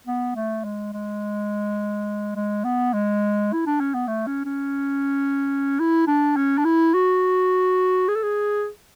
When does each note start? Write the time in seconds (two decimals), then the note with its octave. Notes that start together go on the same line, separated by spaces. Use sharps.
0.07 B3
0.36 A3
0.64 G#3
0.93 G#3
2.36 G#3
2.64 B3
2.94 G#3
3.53 E4
3.67 D4
3.80 C#4
3.94 B3
4.08 A3
4.27 C#4
4.46 C#4
5.80 E4
6.08 D4
6.37 C#4
6.58 D4
6.65 E4
6.94 F#4
8.09 G#4
8.16 A4
8.23 G#4